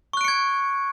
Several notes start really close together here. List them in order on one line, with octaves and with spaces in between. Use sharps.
C#6 F#6 D7 C#7 G#6